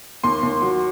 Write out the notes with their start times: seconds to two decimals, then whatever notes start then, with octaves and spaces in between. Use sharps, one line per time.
0.24 D#2 C6
0.43 D#2
0.62 F#3